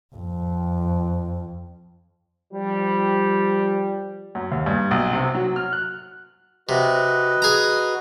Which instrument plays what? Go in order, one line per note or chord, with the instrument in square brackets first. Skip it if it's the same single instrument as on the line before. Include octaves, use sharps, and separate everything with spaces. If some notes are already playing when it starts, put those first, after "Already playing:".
[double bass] F2
[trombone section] F3 G3
[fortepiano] F#2
D#2
G2
B1
C3
F#3
F6
F#6
[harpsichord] C3 [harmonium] F#4 B4 D#5
[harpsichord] G#4 A#5